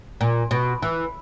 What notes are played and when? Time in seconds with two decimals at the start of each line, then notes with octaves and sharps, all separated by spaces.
0.21 A#2
0.51 B2
0.82 E3